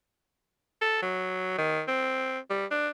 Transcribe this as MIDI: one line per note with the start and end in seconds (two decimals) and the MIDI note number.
0.81 1.01 69
1.02 1.55 54
1.58 1.82 51
1.88 2.39 60
2.50 2.66 55
2.71 2.89 62